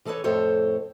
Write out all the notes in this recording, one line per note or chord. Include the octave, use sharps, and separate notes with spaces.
E3 G#4 A4 B4 C#5
F2 A2 A4 C5 C#5